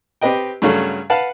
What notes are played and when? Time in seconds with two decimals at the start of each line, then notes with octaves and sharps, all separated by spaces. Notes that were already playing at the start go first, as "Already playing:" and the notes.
0.22 C4 G4 B4 D#5 G5
0.62 G2 C#3 F#3 A3
1.10 B4 F5 F#5 A5